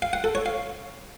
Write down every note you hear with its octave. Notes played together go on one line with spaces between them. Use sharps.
F5
F#5
A4
C#5
F5